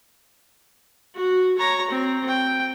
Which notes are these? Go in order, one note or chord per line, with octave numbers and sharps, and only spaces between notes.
F#4
C#5 A#5
C4
G5